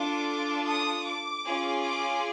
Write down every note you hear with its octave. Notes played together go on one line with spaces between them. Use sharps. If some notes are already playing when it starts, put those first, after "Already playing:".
Already playing: D4 F4 A4 D6
D#6
D6
C#4 F4 G#4
D6